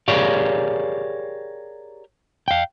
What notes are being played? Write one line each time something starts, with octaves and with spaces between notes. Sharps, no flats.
G4 G#4 A#4 C#5 D5 F5
F5 G5